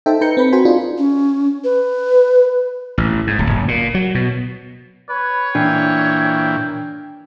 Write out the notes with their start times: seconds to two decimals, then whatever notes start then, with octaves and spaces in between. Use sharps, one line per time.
0.06 D#4 A4 C5 E5 G5 A5
0.21 D#4 B4 A#5 G6 C#7
0.37 C4 B4 B5
0.52 F#4 A#4 C5 G#5 B5 C6
0.65 D4 D#4 F4 G#4
0.98 C#4
1.64 B4
2.98 A1
3.27 G#2
3.39 D1
3.50 F#1
3.68 A#2
3.94 F#3
4.15 B2
5.10 B4 C#5
5.55 A#2 E3 D4 G5